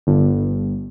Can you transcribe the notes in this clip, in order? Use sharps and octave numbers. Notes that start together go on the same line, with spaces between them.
G1